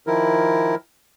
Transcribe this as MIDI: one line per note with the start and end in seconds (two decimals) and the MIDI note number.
0.07 0.75 51
0.07 0.75 53
0.07 0.75 64
0.07 0.75 70